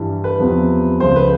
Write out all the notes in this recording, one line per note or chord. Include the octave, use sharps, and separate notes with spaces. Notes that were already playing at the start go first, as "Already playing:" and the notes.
Already playing: G2 E3 G3
B4
E2 C3 F3
C#2 C#3 F3 C5
B4